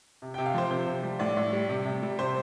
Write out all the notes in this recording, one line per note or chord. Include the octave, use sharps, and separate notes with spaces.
C3
C3 G5
F5
F3 C5
C3 C5
C3
G3
A2 D5
A2
G3
C3
C3
G3
C3 C5